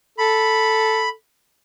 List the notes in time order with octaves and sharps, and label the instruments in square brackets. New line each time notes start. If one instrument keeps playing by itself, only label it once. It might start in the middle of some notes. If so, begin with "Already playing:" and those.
[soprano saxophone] A4 [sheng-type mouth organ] B5